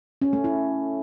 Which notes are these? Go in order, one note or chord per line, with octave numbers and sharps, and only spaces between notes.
C#4
A3
E4